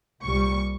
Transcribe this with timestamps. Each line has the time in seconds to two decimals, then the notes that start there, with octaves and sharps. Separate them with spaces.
0.22 C2 A#2 G3 C#6